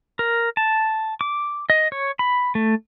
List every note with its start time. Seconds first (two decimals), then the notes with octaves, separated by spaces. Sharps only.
0.19 A#4
0.57 A5
1.21 D6
1.70 D#5
1.92 C#5
2.19 B5
2.55 A3